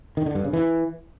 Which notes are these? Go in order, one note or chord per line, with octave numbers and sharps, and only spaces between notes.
D#3
D3
G2
C#3
E3